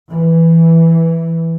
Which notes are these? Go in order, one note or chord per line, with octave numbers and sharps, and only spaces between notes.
E3